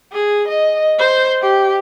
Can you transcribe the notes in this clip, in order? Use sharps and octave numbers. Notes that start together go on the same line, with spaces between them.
G#4
D#5
C5
G4